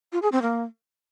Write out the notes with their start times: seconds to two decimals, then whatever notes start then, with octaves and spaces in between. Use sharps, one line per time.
0.12 F4
0.22 G#4
0.32 C4
0.42 A#3